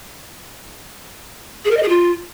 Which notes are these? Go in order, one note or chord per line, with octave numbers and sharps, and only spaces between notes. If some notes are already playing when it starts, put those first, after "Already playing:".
G#4
A#4
D#5
G#4
F4